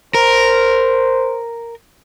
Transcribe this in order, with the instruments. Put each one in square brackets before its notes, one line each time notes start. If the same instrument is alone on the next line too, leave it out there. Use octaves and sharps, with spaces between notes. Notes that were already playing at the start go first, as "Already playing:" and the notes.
[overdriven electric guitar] A#4 [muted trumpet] C5